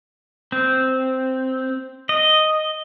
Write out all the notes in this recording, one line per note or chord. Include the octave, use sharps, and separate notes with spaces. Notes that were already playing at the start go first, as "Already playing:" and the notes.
C4
D#5